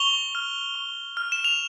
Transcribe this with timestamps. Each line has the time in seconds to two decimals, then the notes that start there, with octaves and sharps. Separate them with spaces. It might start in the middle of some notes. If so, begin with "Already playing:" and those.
Already playing: C#6 F7 G7
0.35 F6
0.75 C#6
1.17 F6
1.32 E7
1.44 F7